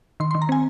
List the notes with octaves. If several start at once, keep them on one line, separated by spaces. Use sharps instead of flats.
D#3 C6
C6
D#3
A#5
C4 G#5